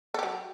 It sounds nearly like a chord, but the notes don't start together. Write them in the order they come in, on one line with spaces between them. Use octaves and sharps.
A4 G4 F#3